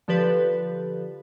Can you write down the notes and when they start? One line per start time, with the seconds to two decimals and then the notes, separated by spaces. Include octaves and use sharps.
0.08 D3 F3 G4 A4 B4